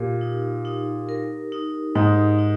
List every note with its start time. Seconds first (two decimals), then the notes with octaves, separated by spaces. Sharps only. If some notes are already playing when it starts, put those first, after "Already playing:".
Already playing: A#2 G4 A#4
0.21 D#4
0.65 D#4
1.09 A#4
1.52 D#4
1.95 G#2 D#4
2.39 D#4